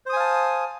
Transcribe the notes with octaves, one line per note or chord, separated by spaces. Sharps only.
C5 F5 G#5 A5 D#6